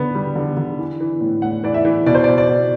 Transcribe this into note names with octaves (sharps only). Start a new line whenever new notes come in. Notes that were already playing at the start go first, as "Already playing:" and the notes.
Already playing: D3 B3
G3
D3
D3
E3
E3
A2
A2 F#5
E3 D5
E5
E3
B2 D5
C5
B2 D5
D5
B2